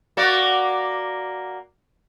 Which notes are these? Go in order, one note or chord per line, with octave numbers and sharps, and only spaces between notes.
A#3 F#4 D5